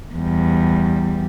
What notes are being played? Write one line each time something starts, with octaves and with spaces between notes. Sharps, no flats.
E2 G3